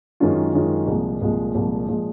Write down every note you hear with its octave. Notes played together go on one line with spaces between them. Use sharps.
F#2 D#3 G#3 C#4 F4
F#2 D#3 G#3 C#4 F4
C2 A#2 F3 G#3
C2 A#2 F3 G#3
C2 A#2 F3 G#3
A#2 F3 G#3